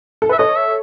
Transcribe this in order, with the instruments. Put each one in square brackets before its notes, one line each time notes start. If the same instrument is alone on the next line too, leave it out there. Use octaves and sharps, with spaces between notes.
[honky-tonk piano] A4
[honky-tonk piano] B4 [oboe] E5
[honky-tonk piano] A4 C#5 [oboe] D#5
[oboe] E5